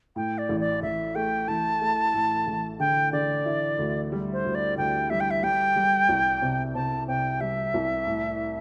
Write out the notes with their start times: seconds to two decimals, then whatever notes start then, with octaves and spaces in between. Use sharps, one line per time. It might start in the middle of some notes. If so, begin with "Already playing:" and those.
0.16 A2 G5
0.38 D5
0.49 A1
0.60 D5
0.82 A1 E5
1.15 A3 G5
1.48 A1 A5
1.81 A3
2.14 A2
2.47 A1
2.80 D3 G5
3.13 D3 D5
3.46 E4
3.79 D2
4.12 G3
4.33 C5
4.45 D2
4.55 D5
4.78 D2 G5
5.10 G3 E5
5.20 G5
5.31 E5
5.43 G3 G5
5.76 G3
6.09 C2
6.42 C3
6.74 C3 A5
7.08 C3 G5
7.41 G3 E5
7.74 C2
8.07 A2